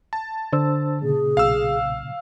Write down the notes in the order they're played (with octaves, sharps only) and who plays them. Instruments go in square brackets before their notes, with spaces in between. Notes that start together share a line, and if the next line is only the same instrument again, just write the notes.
[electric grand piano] A5
[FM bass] D3 [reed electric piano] D4 C5 E6
[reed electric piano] A#2 C#3 [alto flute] G#4
[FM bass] B1 [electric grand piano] F5 E6